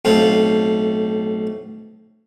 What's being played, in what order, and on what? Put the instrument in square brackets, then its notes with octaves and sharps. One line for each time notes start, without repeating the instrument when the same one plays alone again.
[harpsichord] B1 A2 C4 F4